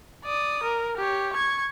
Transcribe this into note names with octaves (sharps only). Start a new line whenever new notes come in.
D5 D#6
A#4
G4 C#5
C#6 G#6